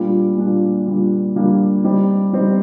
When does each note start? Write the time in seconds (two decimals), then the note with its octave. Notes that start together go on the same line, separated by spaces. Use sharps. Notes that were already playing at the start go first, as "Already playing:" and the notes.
Already playing: A#2 G3 A#3 D4 F4
0.37 A#2 G3 A#3 D4 F4
0.86 A#2 G3 A#3 D4 F4
1.35 A#2 G3 A#3 D4 F4
1.84 G3 C4 D#4
2.33 G3 C4 D#4